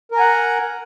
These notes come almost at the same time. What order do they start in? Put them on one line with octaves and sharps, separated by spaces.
A#4 A#5 G#5 F#5